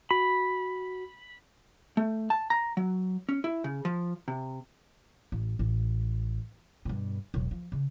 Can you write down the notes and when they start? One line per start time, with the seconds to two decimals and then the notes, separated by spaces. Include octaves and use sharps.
0.11 F#4 B5
1.97 A3
2.30 A5
2.50 A#5
2.77 F#3
3.29 C#4
3.44 E4
3.64 C#3
3.85 F3
4.28 C3
5.32 A1
5.59 A1
6.85 G2 B2
7.34 E1 B1
7.51 F3
7.72 C#3